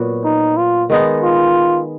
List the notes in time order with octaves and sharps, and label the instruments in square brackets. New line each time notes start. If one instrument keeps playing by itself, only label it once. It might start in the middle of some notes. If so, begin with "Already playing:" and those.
Already playing: [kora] A#2 F#3 B3 F#4
[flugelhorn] D#4
F4
[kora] D#3 G#3 B3 D#4
[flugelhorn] F4